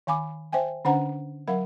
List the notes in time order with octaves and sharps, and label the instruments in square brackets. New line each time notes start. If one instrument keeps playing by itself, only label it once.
[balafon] D#3 F5 G#5 B5 D6
C5 E5 G5 G#5
D3 C#4 D4 C5 F#5 A#5
F#3 A#4 F5 F#5 B5